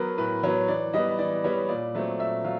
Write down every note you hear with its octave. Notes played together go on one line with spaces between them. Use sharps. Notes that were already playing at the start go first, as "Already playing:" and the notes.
Already playing: F#3 B3 A#4 B4
A2 B4
F#3 B3 C#5
E3 D5
G3 B3 D#5
E3 D5
G3 B3 C#5
A#2 D5
F#3 A3 C4
A#2 E5
F#3 F5